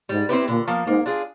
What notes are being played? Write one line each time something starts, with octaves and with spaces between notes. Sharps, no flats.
G#2 G3
C4 E4 G4 B4
A#2 D3
F3 A#3
G#2 A#3
D4 F4 G#4